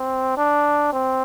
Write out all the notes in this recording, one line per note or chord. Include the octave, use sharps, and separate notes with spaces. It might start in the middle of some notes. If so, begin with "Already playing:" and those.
Already playing: C4
D4
C4